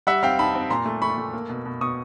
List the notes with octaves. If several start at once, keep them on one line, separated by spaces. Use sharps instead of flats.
G3 E5 F#5
C4 F5 G5
D#4 A5 B5
C4
A#2 A#5 C6
A3
A3 B5 C#6
A3
A#3
B2
B2
B2 C#6 D#6